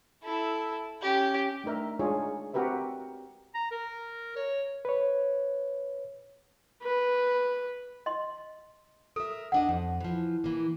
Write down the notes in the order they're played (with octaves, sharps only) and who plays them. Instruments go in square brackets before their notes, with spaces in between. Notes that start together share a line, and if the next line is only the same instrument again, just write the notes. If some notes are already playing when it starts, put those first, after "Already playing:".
[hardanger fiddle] E4 A4
C#4 G4
[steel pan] A3 D4 D#4 A#4 E5
G#3 D4 D#4 F4 G#4 C#5
C4 F#4 G4 A#4 B4 E5
[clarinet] A#5
A#4
C#5
[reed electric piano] B4 C#5
[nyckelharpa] B4
[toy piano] D#5 C6
[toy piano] A4 [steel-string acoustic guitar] A#4 E5
[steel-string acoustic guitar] E2 D4 D#5 [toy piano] F#5
[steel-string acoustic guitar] F2
E3 F3
E3 A#3